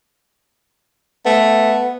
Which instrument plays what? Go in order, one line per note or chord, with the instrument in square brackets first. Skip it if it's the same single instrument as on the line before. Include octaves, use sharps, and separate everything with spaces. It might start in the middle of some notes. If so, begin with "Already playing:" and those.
[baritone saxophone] A3 [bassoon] B3